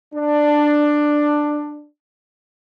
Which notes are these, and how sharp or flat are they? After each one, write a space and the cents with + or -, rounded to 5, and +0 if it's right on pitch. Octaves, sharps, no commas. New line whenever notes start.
D4 +10